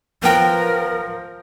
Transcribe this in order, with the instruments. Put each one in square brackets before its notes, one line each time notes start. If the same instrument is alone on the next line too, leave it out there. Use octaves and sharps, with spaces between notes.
[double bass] F3 [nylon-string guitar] B3 G5 [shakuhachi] A#4